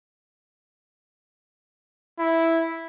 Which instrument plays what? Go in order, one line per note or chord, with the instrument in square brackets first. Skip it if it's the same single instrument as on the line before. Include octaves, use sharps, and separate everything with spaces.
[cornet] E4